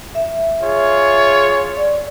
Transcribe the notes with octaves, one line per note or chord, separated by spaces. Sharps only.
E5
F4 G#4 C#5
D5